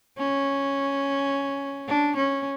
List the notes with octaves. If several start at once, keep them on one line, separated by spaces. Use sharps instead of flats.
C#4
D4
C#4